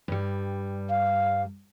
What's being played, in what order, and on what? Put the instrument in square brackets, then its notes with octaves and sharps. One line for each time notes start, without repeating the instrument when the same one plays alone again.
[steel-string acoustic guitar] G2 G3
[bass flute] F5